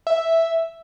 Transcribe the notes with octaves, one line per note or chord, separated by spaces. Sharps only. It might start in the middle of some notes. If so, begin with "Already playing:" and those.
E5